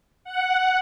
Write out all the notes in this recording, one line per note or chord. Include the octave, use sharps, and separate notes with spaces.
F#5